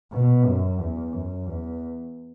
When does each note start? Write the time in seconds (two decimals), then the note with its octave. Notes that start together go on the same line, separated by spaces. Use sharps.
0.12 B2
0.45 F#2
0.79 E2
1.12 F#2
1.47 E2